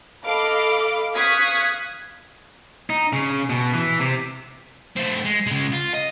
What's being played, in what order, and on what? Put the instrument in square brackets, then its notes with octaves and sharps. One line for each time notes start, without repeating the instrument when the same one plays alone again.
[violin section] A4 D#5 F5 B5 D6
F5 C#6 D#6 F#6 G#6 B6
[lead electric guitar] D#4
C#3
B2
E3
C3
[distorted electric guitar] A3 C4
G#3
C#3 G#3
F4
D#5